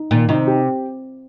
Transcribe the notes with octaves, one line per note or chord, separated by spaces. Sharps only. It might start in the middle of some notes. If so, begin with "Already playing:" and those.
Already playing: D#4
A#2 D#3
C3 D#4
G4